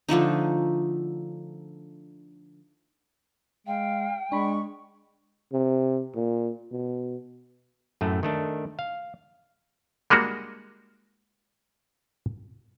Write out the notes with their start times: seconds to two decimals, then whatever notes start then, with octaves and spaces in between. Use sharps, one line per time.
0.09 D3 F3 A3 D#4
3.67 G#3 F5 G5
4.32 G#3 D4 B5 C#6
5.53 C3
6.15 A#2
6.72 B2
8.01 F#2 A2 A3
8.23 D#3 A3 D4
8.79 F5
10.10 G3 G#3 A#3 D4 F#4